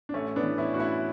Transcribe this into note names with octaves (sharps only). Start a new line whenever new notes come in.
D4
A1 A3 C#4
B3 D4
E3
C#4 E4
A2 F#4
C#4 E4